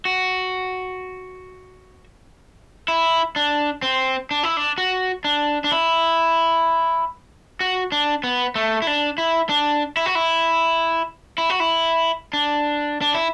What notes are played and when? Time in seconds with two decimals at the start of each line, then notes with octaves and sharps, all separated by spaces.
0.05 F#4
2.88 E4
3.36 D4
3.82 C4
4.31 D4
4.43 E4
4.57 D4
4.78 F#4
5.24 D4
5.64 D4
5.72 E4
7.60 F#4
7.92 D4
8.24 B3
8.55 A3
8.82 E4
8.87 D4
9.18 E4
9.49 D4
9.97 E4
10.06 F#4
10.15 E4
11.38 E4
11.50 F#4
11.60 E4
12.33 D4
13.01 D4
13.14 E4